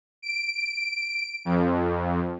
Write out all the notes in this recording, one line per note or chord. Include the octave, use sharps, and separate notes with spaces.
D7
F2